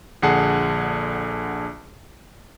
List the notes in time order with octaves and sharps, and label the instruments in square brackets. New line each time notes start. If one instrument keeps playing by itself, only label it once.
[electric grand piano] A#1 D3 G#4 F#5 A5 C7